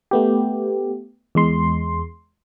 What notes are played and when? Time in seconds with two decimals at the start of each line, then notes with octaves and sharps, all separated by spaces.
0.11 A3 B3 G4
1.35 E2 G#3 C6